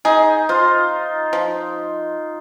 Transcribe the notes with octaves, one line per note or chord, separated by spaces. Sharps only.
D#4 G#4
F4 C5
F3